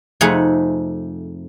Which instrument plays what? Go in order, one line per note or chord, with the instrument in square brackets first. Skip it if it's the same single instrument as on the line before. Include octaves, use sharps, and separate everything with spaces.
[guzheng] F2 C3 A3 D#4 G#4 F#5